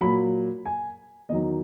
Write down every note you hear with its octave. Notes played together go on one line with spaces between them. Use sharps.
A#2 F#3 B5
G#5
E2 D#3 F#3 D#5